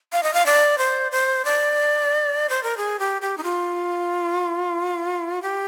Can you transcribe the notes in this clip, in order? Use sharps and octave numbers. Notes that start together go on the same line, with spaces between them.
F5
D#5
F5
D5
C5
C5
D5
C5
A#4
G#4
G4
G4
D#4
F4
G4